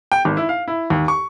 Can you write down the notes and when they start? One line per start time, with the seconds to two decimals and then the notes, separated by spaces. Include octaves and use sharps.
0.12 G5
0.25 G#1
0.37 E4
0.49 F5
0.68 E4
0.90 D#2
1.08 C#6